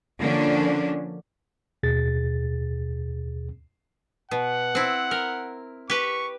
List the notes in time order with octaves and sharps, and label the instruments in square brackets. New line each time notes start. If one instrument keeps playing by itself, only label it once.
[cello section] D3 F3 A#3 C#4 D4
[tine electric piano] D#2 B2 G#4 A6
[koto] B2 [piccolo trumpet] F#5
[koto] C4 E4
A#4
[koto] G4 B4 [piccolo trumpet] C#6